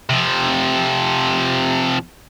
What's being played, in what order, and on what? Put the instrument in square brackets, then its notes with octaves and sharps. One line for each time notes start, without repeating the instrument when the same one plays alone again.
[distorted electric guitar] C3 F3